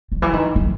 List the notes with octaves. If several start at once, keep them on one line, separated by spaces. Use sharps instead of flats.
D#3
E3
D#3
D#3